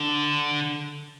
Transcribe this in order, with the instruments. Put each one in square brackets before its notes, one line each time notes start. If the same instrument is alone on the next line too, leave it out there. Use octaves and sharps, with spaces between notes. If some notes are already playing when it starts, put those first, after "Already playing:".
Already playing: [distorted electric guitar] D3